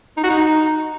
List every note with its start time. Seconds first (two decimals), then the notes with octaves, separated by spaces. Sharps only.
0.17 D#4
0.24 F#4
0.30 D#4